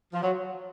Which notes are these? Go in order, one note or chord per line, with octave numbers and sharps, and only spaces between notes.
F3
F#3